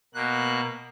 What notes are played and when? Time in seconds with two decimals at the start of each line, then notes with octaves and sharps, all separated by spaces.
0.14 B2 A#3 F#6